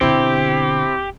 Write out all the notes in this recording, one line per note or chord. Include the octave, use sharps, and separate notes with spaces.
B2 D3 C4 E4 G4